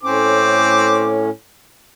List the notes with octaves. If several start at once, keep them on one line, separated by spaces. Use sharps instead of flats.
A2 C4 C#4 D6